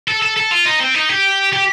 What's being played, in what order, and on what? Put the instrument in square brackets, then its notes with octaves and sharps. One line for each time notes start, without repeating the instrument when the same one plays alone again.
[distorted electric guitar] A4
A4
A4
F4
D#4
C4
D#4
G4
G4